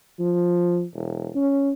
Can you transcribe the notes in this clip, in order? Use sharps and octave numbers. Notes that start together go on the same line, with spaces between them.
F3
E1
C#4